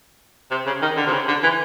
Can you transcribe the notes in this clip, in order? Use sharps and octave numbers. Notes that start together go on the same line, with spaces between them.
C3
C#3
D#3
D3
C3
C#3
D3
E3